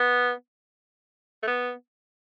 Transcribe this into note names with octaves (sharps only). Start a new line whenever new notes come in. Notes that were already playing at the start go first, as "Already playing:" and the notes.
Already playing: B3
A3
B3